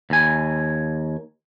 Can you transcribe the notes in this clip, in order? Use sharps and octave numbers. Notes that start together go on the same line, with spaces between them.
D#2 G#5